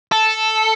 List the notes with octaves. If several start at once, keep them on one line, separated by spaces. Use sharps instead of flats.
A4